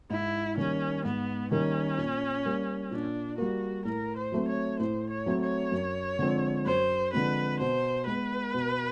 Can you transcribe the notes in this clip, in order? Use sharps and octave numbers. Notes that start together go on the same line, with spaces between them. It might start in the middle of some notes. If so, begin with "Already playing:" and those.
G#2 E4
D#3 G3 A#3 C#4
G#2 B3
D#3 G3 A#3 C#4
A#2
G3 A#3
A#2 D4
G3 A#3 F#4
A2 A#4
C5
F#3 A3 C4
C#5
A2 C5
C#5
F#3 A3 C4
C#5
F#2
D3 F3 G#3 C4
F#2 C5
D3 F3 G#3 C4 B4
B2 C5
G#3 B3 B4
B2